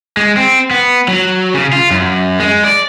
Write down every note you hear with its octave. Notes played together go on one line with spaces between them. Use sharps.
G#3
C4
B3
F#3
C#3
F4
F#2
G#3
D5